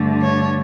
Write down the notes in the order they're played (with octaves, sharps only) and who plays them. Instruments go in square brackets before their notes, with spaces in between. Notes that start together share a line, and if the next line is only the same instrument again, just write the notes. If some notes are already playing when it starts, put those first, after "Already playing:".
Already playing: [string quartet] G2 D3 A3
C#5